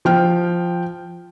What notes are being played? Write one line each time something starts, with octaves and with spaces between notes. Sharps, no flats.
F3 G5 F6